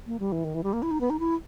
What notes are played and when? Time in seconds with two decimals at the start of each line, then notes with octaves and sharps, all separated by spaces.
0.07 A#3
0.20 G3
0.32 E3
0.44 D#3
0.55 E3
0.64 G3
0.73 A#3
0.82 E4
0.91 D#4
1.01 B3
1.10 D#4
1.19 E4